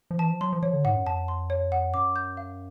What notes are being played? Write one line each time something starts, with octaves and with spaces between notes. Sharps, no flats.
F3
E3 A5
F3
F#3 C6
F3
F3 C#5
D3
G#2 F#5
F#2
F2 A5
C6
C#5
F#5
F#2 D6
G6
F5